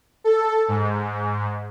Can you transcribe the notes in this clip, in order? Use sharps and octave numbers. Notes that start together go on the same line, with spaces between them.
A4
G#2